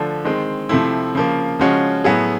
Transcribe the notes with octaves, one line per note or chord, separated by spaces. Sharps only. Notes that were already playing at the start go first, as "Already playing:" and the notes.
Already playing: D3 F3 A3 D4
D#3 G#3 C4
C3 F3 A3 C4 E4
C#3 F3 A#3
C#3 F3 G#3 C#4 F#4
A2 F#3 B3 E4 G#4